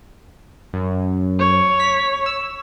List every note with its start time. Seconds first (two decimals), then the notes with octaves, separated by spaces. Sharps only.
0.73 F#2
1.39 C#5
1.80 B6
2.26 E6